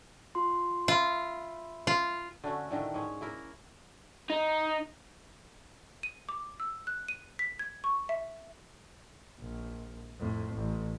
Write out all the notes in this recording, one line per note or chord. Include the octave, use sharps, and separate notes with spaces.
F4 C6
F4 E5 B5
F4
D3 A3 C#4 F#4
A2 D3 D#3 A3
G#2 C#4
A#3 E4 A#4
D#4
D#7
D6
E6
F#6
D#7
B6
G#6
C#6
E5
A#1
F2 A2
A1